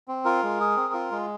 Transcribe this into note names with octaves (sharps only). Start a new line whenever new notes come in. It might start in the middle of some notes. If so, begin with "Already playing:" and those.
C4
F4 A#4
G#3
G#4
C4
F4
G#3